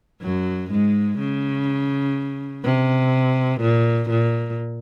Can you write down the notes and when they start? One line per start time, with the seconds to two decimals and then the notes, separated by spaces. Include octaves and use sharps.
0.22 F#2 F#3
0.71 G#2 G#3
1.19 C#3
2.65 C3
3.61 A#2
4.10 A#2